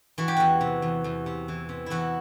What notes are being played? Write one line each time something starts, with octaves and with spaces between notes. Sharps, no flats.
E3 F#4
G4
E2 F#4
C3
E2
E2
C3
E3
C3
E2 E4 F#4